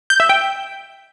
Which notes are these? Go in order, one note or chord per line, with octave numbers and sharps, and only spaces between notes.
G6
E5
G5